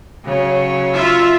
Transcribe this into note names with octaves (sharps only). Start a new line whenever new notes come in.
C#3 F#3 C#5
F4 E5